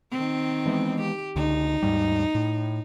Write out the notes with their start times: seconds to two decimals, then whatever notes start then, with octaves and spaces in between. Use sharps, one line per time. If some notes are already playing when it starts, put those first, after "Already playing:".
0.12 D#3 C4
0.66 E3 G#3 B3
1.01 G4
1.36 C#2 D3 D#4
1.82 D#2 G#2 G3
2.35 A2